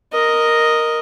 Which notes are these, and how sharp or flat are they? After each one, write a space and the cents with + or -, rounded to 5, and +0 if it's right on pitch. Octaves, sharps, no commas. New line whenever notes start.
A#4 +0 D#5 +0